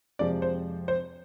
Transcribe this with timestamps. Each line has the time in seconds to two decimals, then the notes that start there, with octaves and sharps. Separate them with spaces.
0.19 F2 C3 F3 G#3 D5
0.42 C5
0.88 C5